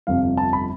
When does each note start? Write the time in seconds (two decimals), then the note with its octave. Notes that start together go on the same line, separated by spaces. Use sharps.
0.07 G1 F2 C3 F5
0.37 A5
0.53 B5